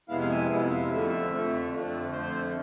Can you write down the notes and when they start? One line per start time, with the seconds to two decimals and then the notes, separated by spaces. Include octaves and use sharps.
0.09 F2 C3 G#3 B3 E4 F5
0.21 F5
0.30 G#5
0.49 F2 C3 G#3 B3 E4
0.70 F5
0.90 F2 D3 F3 A3 E5
1.30 F2 D3 F3 A3
1.72 F2 D3 F3 A3
2.12 F2 D3 F3 A3 C5